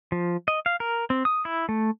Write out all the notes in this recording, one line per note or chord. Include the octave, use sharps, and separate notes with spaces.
F3
D#5
F5
A#4
C4
D#6
E4
A3